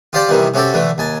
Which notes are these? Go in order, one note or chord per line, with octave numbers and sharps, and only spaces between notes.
F4 G4 C5 D5 G5 A5
C3 D#3 E3 G3
C3 C#4 F#4 G4 A4
D3 E3 A3
D#2 G#5 A5